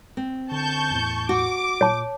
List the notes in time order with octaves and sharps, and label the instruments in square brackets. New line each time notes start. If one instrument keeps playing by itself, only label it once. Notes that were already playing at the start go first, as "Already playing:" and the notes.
[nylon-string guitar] C4
[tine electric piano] D3 [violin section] A5 C#6 G6
[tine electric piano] E2 A2
[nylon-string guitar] F#4 [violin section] D6
[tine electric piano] A#2 [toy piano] C#5 A5